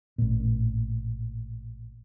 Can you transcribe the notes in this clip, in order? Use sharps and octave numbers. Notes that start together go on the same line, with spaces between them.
A1 A#2